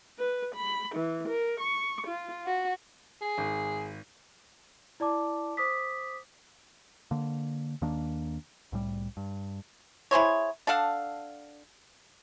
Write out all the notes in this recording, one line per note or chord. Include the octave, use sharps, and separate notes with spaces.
B4
B5
E3
A#4
C#6
F4
F#4
G#4
G#1
E4 D5 A5 D6
C5 D6 D#6 B6
D3 A#3
D#2 D#3 A#3 D4
C2 A2 G3
G2
E4 G#4 C5 C#5
D4 A4 F5 F#5